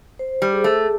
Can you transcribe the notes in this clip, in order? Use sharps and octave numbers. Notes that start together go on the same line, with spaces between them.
C5
G3
G#4
A3